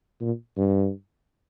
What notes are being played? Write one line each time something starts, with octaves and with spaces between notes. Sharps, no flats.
A#2
G2